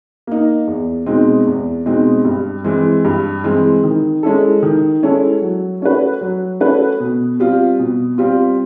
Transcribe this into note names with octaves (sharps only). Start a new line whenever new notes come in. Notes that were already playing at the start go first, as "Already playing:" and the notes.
A#3 D#4
E2
B2 G#3 C4 D#4
E2
B2 G#3 C4 D#4
G2
E3 G#3 C4
G2
E3 G#3 C4
D#3
G#3 C#4 E4 A4
D#3
G#3 C#4 E4 A4
F#3
A3 C#4 F#4 B4
F#3
A3 C#4 F#4 B4
B2
G3 C4 F4
B2
G3 C4 F4